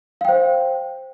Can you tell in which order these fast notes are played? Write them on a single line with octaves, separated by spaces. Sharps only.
F5 G5 C5